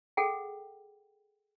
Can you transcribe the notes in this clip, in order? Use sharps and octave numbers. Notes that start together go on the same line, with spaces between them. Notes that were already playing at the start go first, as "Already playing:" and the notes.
G#4 A4 F#5 G5